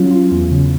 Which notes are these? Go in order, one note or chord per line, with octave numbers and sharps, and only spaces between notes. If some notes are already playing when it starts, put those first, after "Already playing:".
Already playing: F#3 C#4 F4
F4
E2
C#3